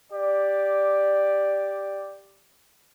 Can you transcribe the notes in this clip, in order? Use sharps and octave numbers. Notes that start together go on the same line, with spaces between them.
G4 D5